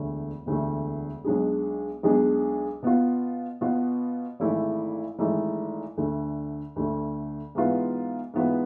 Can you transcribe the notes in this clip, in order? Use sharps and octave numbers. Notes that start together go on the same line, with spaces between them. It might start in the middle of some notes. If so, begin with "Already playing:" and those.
Already playing: E1 D2 D3 A3
E1 D2 D3 A3
B1 B2 G#3 D4 G#4
B1 B2 G#3 D4 G#4
B2 B3 F4
B2 B3 F4
G#1 G#2 E3 A3 E4
G#1 G#2 E3 A3 E4
D2 D3 A3
D2 D3 A3
G#2 E3 B3 F4 B4
G#2 E3 B3 F4 B4